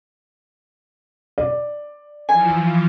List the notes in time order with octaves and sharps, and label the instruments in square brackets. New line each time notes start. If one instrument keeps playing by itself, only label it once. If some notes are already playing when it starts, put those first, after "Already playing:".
[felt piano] D5
[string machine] E3 F3 [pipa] G#5